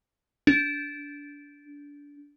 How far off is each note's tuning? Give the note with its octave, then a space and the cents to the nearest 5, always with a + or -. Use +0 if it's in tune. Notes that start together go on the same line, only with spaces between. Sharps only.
D4 -20